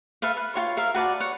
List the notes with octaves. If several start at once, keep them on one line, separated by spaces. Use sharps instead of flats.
A4 B4 E5 F5
B4
F4 F#4 C#5 C6
A#4 E5 F5
F#4 B4 D5 A5
C#5 F#5